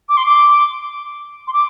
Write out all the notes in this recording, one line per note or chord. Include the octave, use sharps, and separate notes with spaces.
D6
C6
D6
C6
D6